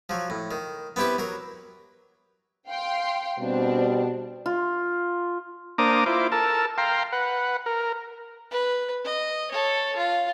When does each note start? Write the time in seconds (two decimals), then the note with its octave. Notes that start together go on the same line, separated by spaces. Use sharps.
0.09 F3 F#3
0.30 A2
0.51 D#3
0.96 B3 C4 E4 G4 B4
1.19 F#3 A#4
2.67 F5 G5 C6
3.39 B2 G3 C4 D4
4.46 F4
5.78 A#3 D4 C5 A#5 D6 D#6
6.06 E4 F4 C5 D6
6.32 A4 A#4 A5
6.78 F5 G5 A#5 C6
7.12 B4 F#5
7.66 A#4
8.51 B4
9.05 D#5
9.52 A4 C#5
9.96 F4